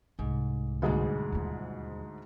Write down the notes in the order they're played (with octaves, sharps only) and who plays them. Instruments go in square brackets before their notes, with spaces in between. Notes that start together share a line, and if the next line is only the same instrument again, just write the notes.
[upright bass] C2 [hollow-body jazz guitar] G#2
[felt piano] D2 G#2 G#4 [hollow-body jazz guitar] B2 G3 G#3
[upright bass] D#2 F4